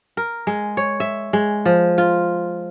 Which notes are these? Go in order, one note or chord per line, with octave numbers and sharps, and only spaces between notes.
A#4
G#3
C#5
E5
G#3
F3
F4